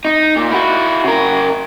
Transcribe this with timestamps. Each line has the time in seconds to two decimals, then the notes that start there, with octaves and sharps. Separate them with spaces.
0.05 D#4
0.36 A#2
0.51 E4 F#4
1.04 C#3 A#4